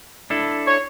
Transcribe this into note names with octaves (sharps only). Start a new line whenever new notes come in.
D4 E4 A4
C#5